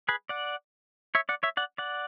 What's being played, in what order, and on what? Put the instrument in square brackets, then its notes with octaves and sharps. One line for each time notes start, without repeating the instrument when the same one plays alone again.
[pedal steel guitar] G#4 B4
D5 F#5
C#5 E5
D5 F#5
C#5 E5
D5 F#5
D5 F#5